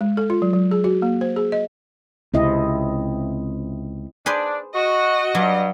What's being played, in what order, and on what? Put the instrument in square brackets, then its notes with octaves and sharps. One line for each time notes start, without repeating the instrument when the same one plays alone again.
[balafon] G#3
A4
F4
F#3
F#3
G#4
F#4
A#3
C5
G#4
D#5
[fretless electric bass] C#2 C3 [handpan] C4 E4 D#5
[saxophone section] D4 [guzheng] G#4 B4 C5
[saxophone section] F#4 [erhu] D#5
[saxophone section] G2 [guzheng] F#3